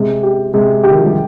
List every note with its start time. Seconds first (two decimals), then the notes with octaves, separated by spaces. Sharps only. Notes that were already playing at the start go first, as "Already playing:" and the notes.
Already playing: C3 G#3
0.23 G4
0.54 C3 G#3
0.83 D3 G4
0.91 D#3
0.98 F3
1.06 G3